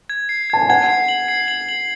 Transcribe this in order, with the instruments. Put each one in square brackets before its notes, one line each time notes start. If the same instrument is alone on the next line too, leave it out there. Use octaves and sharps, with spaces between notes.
[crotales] G#6
C7
[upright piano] A5 [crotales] G#6
[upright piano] G#5
[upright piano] F#5 [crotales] G#6
[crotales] C7
F#7
C7
F#7
F#7